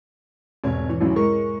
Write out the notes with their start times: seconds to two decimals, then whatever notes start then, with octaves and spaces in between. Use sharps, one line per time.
0.64 F1 E2 G#2 B2 C#5
0.89 E3 C#5
1.01 A1 F#2 D#3 E4
1.16 G#3 A#4 C#6